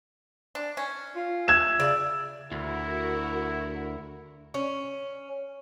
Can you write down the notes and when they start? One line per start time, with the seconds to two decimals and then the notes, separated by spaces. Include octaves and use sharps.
0.55 D4
0.77 C#4
1.16 F4
1.48 E5 G#6 E7
1.80 C#3 D5
2.52 D2 E4 F#4 A#4
4.54 C#4